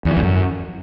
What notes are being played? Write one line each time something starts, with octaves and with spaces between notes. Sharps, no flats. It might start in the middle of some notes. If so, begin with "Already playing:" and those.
E2
E3
E2
F#2